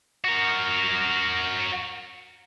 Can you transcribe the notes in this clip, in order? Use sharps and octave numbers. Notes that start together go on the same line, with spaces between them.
F#4 A#4